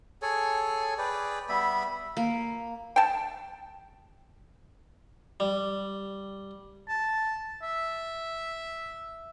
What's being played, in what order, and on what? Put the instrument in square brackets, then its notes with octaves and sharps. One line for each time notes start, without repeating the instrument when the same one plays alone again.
[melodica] G#4 A4 C#5 G#5
G#4 B4 D5 G5
G3 B3 E5 B5
[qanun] A#3
[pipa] G5 A5
[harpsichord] G3
[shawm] A5
E5